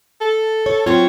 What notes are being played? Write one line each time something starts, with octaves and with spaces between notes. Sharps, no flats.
A4
C#5
F#3 C4 F4 C#5